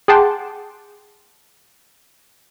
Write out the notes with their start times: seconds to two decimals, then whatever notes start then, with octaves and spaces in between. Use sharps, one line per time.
0.08 G#4 F#5 G5 A5 C6 D6